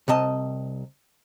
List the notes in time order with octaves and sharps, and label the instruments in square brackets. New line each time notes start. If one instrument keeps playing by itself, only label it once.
[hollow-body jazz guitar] C2 C3 D#5 A5